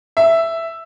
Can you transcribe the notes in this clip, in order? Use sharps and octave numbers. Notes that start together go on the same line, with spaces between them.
E5